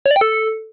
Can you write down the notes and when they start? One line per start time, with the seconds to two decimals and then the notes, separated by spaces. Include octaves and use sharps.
0.06 C#5
0.11 D5
0.16 G5
0.21 A4